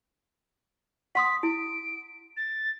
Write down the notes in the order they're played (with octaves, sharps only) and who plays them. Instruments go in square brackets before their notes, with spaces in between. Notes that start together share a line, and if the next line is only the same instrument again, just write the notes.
[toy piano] F#5 C6 D#6 [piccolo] B6
[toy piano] E4 [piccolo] D7
[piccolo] A6